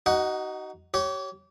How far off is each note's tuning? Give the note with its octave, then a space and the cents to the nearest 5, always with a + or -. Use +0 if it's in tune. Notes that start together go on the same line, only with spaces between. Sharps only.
D#4 +0 F#4 +35 F#5 +0
G4 -35 C#5 +0